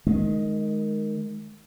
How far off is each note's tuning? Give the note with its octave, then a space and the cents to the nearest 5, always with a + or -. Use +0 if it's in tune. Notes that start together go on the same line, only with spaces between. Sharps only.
D#3 -5 G#3 +25